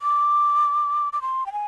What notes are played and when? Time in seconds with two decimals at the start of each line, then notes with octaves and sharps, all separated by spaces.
0.02 D6
1.13 D6
1.22 C6
1.46 G5
1.52 G#5